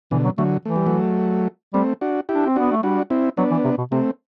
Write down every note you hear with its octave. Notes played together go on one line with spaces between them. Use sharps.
B2 D3 E3
F#3
D3 F#3 A3
E3 A3
G3
F#3 A3
G3 A3 C4
D4 F#4
E4 G4
D4
C4
B3 D4 F#4
A3
G3 D4 F#4
C4 E4
F#3 B3 D4
E3
C3
B2
C3 A3 C4